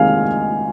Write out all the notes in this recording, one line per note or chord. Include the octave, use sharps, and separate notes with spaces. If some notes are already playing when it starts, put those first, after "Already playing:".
Already playing: C3 D#3 G#3 F5 G#5 F6